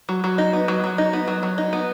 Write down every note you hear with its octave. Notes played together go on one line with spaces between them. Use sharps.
F#3
F#3
D#4
B3
F#3
F#3
D#4
B3
F#3
F#3
D#4
B3